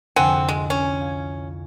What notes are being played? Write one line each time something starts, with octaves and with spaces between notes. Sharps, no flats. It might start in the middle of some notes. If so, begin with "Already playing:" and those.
C2 F2 D3 C4 F#5 G#5
G#3 D7
C#4
F5 G#6